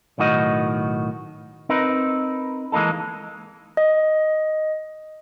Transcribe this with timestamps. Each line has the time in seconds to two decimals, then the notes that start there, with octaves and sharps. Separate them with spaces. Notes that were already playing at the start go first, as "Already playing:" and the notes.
0.18 B1 A2 D#3 F#4 D#5
1.69 C4 D#4 A#4 B4
2.72 E3 G#3 A#3 D#4 A4
3.77 D#5